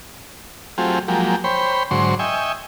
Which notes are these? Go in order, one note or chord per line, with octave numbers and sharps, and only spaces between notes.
F#3 A3 C4 F4 G4 G#4
F3 F#3 G#3 A#3 G4
C5 C#5 G5 B5
G#2 D3 F#3 C5 C6 C#6
D#5 E5 G5 G#5 C#6